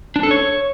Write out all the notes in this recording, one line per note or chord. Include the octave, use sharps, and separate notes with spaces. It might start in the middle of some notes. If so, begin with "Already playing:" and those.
D4
A4
C#5